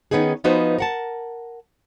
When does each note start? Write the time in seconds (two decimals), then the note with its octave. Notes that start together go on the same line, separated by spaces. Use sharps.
0.11 D#3 B3 C#4 D#4 G#4
0.44 F3 B3 D#4 F#4 B4 C5
0.78 A#4 F#5 A5